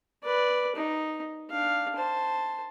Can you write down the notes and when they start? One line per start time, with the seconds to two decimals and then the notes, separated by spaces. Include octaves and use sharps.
0.23 B4 D5
0.75 D#4
1.50 D4 F5
1.96 C5 A5